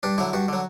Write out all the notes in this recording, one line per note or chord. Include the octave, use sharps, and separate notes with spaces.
G2 D4
D3 F#3 E4
G2 F#4
D3 F#3